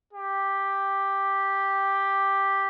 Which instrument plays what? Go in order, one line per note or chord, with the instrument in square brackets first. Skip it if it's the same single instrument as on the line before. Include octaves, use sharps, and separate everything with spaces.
[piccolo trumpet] G4